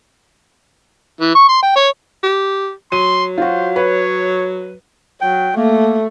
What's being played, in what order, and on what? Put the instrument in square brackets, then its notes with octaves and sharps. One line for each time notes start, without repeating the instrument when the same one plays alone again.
[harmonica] E3
C#6
C6
G5
C#5
[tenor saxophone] G4
[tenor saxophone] F#3 [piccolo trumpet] C6 [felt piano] D#7
[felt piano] F4 F#4 [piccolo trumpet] C5
[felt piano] B4 [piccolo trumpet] C#5
[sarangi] F#3 [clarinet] G5
[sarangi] A3 [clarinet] A#3